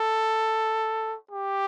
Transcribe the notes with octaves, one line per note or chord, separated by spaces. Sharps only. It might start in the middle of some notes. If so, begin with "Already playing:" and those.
Already playing: A4
G4